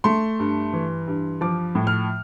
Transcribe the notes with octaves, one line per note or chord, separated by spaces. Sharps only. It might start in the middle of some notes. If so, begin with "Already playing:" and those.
A3 C6
G2
E3
G2
F3 D6
A2
F6